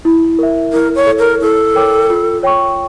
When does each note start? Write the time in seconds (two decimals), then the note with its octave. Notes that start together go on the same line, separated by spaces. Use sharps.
0.05 E4
0.39 A#4 E5
0.73 E4 A#4
0.95 C#5
1.06 A4
1.12 C#5
1.19 A#4
1.41 E4 A4
1.75 A#4 C#5 G5 D6
2.10 F4
2.43 C#5 G5 C#6